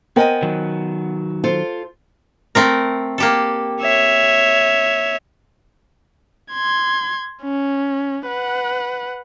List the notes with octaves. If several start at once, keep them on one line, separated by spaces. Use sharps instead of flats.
B3 A#4 C5 D#5 G5 G#5
D#3 F#3
F4 A4 C5
A3 C4 A#4
A#3 G4 A4
C#5 E5
C6 G#6
C#4
B4 F#5